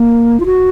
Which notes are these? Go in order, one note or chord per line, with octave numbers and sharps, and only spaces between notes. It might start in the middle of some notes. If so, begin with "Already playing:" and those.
Already playing: A#3
F4
F#4